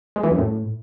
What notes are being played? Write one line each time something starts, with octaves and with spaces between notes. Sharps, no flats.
G#3
E3
F#2
A2